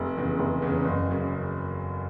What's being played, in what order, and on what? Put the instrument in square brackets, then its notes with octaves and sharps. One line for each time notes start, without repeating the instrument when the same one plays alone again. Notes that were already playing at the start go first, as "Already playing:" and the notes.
Already playing: [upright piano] F1
E2 C#3
F1
E2 C#3
F#1
F#2 C#3